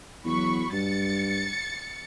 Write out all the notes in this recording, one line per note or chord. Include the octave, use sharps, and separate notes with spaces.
E2 F#3 B5 C#6
G2 A6 C#7